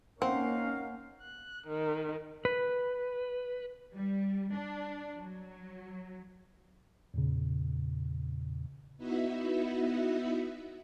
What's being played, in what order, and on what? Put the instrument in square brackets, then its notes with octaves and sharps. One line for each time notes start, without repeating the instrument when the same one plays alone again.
[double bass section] A#3 C#4 [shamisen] C4 [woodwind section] D#4 F5 [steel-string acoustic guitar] F#5
[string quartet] F#6
D#3
[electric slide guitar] B4
[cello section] G3
D4
F#3
[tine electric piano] E2 A#2 C#3
[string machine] B3 D#4 E4 F#4 E5